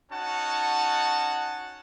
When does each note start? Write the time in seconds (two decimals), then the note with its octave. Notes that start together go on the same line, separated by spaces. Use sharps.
0.11 C#4 D#4 F#4 F#5 A5